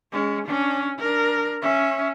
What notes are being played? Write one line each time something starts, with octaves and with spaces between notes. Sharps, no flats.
G#3 C#4
C#4 D4
D4 A#4
C#4 E5